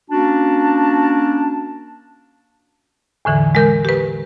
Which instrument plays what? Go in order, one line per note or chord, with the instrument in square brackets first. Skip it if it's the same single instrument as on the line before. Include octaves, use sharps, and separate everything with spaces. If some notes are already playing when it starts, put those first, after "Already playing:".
[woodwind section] A#3 C#4 D4 F#4 A5
[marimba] E2 A2 D3 E3
G#3 A#4 G6
G4 B4